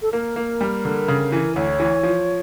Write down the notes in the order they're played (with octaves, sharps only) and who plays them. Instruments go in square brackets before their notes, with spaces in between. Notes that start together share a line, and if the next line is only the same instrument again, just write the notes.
[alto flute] A4
[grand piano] A#3 [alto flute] A#4
[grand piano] A#3
G3
D3
C#3
E3
[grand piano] D2 [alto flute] C#5
[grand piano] E3
F3